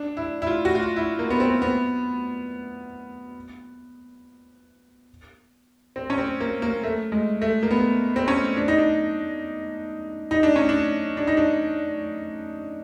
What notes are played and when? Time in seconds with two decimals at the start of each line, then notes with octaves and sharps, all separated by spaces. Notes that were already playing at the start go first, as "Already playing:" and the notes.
Already playing: D4
0.17 E4
0.42 E4
0.47 F4
0.65 F#4
0.75 F4
0.96 E4
1.19 A#3
1.30 B3
1.40 C4
1.62 B3
5.96 C4
6.10 C#4
6.18 C4
6.40 A#3
6.62 A#3
6.83 A3
7.12 G#3
7.42 A3
7.63 A#3
7.71 B3
8.16 C4
8.28 C#4
8.57 D4
8.68 D#4
8.78 D4
10.31 D#4
10.43 D4
10.56 C#4
10.69 D4
11.17 D4
11.27 D#4
11.37 D4